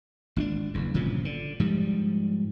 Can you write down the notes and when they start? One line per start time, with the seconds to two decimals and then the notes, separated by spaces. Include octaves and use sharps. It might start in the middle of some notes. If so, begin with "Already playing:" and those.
0.36 G#1 C#4 D4
0.74 F#1 E2
0.94 G1 A#2 C#3 F3
1.25 D3
1.60 G#2 F3 G3